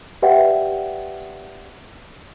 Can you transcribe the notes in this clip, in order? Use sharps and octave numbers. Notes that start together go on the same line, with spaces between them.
G4 B4 D5 E5 F#5 G5